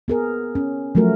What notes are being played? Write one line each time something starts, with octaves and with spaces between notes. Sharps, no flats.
B3 G#4 A#4
C#4
F3 F#3 A3 F#4 A#4